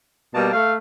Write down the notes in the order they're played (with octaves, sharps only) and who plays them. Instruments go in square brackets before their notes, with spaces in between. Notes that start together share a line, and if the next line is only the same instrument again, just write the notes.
[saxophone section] B2 G3 A#3 [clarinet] A5
[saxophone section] A3 [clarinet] F5